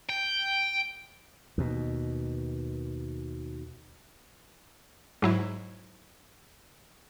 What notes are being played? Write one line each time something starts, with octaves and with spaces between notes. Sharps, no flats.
G5
D#2 B2
G#2 F#3 E4